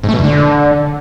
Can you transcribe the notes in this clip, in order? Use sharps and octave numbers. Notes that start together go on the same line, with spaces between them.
G#2
A3
B2
E2
D3